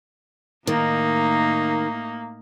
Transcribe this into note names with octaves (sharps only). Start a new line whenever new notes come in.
A2 D#3 A#3 D#4